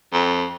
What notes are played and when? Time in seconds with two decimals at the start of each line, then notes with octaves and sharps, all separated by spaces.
0.13 F2